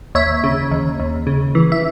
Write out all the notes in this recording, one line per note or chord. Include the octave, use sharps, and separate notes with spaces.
D#2 C#5 E5
C#3
D#2
D#2
C#3
E3
E5